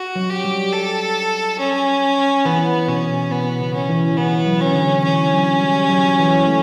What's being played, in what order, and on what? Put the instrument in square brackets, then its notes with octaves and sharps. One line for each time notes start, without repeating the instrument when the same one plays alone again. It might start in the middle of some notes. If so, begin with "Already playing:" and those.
Already playing: [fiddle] F#4
[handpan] F#3
[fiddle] G4
[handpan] G3
[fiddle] A4
C#4
[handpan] E3 [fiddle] B3
[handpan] B2 [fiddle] C#4
[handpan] B2 [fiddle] B3
[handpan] C#3
[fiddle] C#4
[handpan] E3
[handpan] E3 [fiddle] B3
[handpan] F#3
[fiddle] C#4
[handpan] D3
[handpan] E3 [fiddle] C#4
[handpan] F#3
G3
F#3
E3
A3